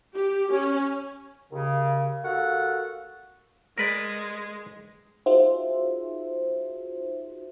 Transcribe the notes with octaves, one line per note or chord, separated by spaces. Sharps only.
G4
C#4
D#2 C#3
D#2 F#4 A4 F5 F#5
G#3 A#4 B4 D5
D#4 F4 F#4 G#4 C5 E5